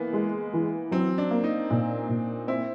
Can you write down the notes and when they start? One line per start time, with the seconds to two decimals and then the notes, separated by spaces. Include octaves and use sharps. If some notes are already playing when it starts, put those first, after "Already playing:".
Already playing: E3 A#3 B3
0.13 G#3
0.54 E3
0.91 F#3 C4
1.18 D4
1.31 A#3
1.44 D#4
1.70 A#2
2.09 A#2
2.48 C4 E4